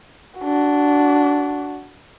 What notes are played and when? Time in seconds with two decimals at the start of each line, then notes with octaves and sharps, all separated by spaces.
0.39 D4 F#4